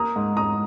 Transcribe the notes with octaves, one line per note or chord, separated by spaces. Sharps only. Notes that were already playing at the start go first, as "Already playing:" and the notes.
Already playing: A#3 A#5 D#6
G#2
G#2 A#5 D#6